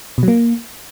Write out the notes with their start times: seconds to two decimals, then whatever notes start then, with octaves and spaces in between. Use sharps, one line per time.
0.18 B2
0.23 F#3
0.28 A#3